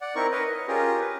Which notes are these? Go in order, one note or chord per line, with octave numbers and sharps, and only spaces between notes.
D5 F#5
C4 D#4 E4 A#4 C#6
A#4 B4 C#5 D#5
D#5
C#4 F4 G4 G#4 A#4
B4